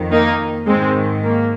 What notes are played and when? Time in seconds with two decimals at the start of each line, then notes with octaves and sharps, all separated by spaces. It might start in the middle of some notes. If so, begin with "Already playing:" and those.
Already playing: F2 D#3
0.12 A#3 D#4
0.67 G#2 D#3 G#3 C4
1.24 A#3